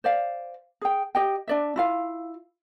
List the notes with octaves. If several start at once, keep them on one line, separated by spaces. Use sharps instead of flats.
C5 D5 F5
G#4 G5
G4 D#5 G5
D4 D5 E5
E4 F4 F5